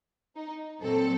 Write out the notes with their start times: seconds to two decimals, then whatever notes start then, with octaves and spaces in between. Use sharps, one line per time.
0.36 D#4
0.82 A#2 F#3 C4 A4